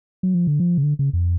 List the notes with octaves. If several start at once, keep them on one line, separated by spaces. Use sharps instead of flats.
F#3
F3
D3
F3
C#3
D3
C#3
F2